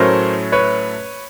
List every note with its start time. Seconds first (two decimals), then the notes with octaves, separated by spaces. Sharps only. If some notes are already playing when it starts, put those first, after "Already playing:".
Already playing: A2 F#3 A3 C#4 A#4 C5
0.52 B4 C#5